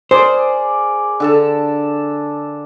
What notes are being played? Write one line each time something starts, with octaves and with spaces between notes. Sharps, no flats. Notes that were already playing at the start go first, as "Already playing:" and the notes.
G#4 A#4 C5 D5
D3 A4 A5